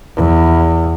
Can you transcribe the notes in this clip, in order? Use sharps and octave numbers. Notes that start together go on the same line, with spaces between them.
E2